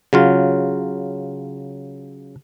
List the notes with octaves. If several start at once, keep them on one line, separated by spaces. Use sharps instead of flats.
C#3 F#3 F4